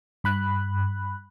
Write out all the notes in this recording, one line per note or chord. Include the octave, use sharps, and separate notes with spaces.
G2 B5 F#6